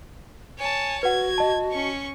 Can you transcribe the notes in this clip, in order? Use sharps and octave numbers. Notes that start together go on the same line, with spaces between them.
C#5 G#5 A5
F#4 B4 F#5 G#6
D#5 A5
C#4 C#6